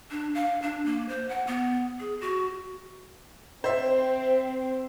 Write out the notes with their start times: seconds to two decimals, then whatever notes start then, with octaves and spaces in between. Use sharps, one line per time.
0.11 D4
0.34 F5
0.62 D4
0.86 A#3
1.08 C5
1.29 F#5
1.47 B3
2.00 G#4
2.21 F#4
3.64 C4 C5 E5